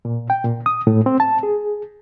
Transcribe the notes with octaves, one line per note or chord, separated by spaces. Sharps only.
A#2
G5
A#2
D#6
A2
C4
A5
G#4